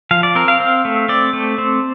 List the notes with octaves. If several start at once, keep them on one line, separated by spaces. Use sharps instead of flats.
F3 F5
D5
C4 A#4
F5
C4
A3
C4 D5
A3
C4